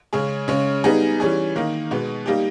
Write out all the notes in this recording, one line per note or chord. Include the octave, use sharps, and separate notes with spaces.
C#3 G#3 C#4 G#4
C#3 G#3 C#4
G3 B3 D#4 G#4
E3 G3 C#4 G#4
D#3 A#3 D#4
B2 G#3 B3
G3 A#3 D#4 G4